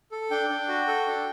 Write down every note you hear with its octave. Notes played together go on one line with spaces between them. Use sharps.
A4
D4 G5
D4
F#4
A4
D4